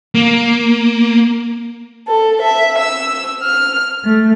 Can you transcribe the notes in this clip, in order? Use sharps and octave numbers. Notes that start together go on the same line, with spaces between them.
A#3
A4
E5
E6
F6
A3